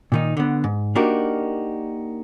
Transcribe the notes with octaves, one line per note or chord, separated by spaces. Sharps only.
A#2 D#3 D#4
D3 B3
G#2
A#3 D4 D#4 F#4 G4 A#4